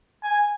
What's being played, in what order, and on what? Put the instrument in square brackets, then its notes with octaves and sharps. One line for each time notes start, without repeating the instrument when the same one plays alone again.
[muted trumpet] G#5